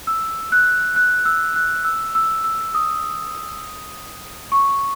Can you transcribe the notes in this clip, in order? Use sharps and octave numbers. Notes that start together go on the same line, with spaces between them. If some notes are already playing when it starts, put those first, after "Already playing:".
E6
F#6
F#6
E6
F#6
E6
E6
E6
D#6
C#6